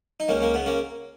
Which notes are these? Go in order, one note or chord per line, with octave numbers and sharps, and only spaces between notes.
D#4
C#2 A#3 C#4
A#3 C#4
C#3 B3
A#3 C#4